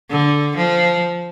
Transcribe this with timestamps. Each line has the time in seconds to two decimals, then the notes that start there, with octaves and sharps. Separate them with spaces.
0.10 D3
0.57 F3